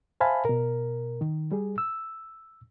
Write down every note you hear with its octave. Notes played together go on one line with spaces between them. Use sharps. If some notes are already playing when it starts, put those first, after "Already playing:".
C5 E5 F5 G#5 A5 B5
B2 A#4
D#3
G3 G#4
E6